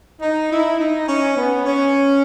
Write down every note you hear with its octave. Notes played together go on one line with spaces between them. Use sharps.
D#4
E4
D#4
C#4
B3
C#4